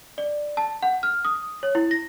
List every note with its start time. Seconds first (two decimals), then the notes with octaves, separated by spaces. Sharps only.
0.18 D5
0.57 A5
0.83 F#5
1.03 F6
1.25 D#6
1.63 C#5
1.75 E4
1.91 A#6